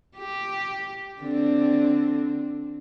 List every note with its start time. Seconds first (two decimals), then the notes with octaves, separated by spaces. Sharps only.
0.17 G4
1.22 D3 C4 D4